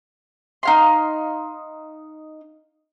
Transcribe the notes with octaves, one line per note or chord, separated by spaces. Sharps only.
D#4 F5 C6